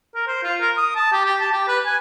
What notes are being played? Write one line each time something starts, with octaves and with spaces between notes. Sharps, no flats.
A#4
C5
F4
A#4
D#6
A5
G4
G4
A5
G4
B4
G#5